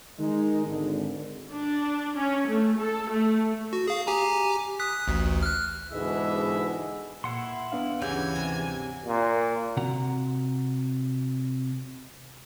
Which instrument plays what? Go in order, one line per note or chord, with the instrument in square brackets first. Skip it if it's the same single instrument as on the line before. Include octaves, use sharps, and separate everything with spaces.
[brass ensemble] D#3 G#3 D#4
G#1 D3
[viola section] D4
C#4
A3
A4
A3
[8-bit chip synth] F#4
G#4 F5
G4 G#5 A#5
D#6 F#6 B6
A1 D2
F6 F#6
[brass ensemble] G#2 B2 D3 E3 G#3 E5
[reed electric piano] A#2 [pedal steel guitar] E4 F#5 C6
[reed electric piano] B3 D4 F5
[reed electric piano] D2 F#5 [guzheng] G2 C#3 [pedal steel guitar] E3 C#5 G6 [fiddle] G#5
[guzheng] C3
[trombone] A#2
[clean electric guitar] C3 F#4 F#5 A#5